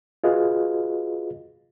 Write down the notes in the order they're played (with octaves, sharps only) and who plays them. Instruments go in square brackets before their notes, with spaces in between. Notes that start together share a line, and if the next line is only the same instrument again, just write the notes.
[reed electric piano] F4 F#4 G#4 B4 D#5 F5